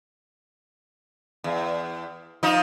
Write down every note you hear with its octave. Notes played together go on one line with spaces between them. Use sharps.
E2
F3 D#4